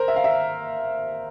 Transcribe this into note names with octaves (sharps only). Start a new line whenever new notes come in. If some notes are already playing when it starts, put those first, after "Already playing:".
Already playing: A#4 C5
E5
F5
E5